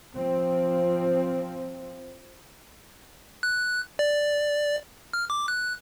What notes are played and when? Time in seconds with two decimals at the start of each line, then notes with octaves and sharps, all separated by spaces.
0.16 F3 C4
3.43 F#6
3.99 D5
5.13 F6
5.30 D6
5.48 F#6